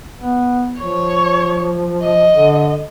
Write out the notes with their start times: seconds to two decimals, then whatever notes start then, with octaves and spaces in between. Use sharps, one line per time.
0.17 B3
0.79 F3 C#5
2.02 D#5
2.33 D3